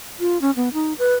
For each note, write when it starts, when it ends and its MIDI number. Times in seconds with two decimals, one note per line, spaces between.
0.20 0.40 65
0.41 0.51 61
0.56 0.69 59
0.73 0.93 63
0.98 1.14 71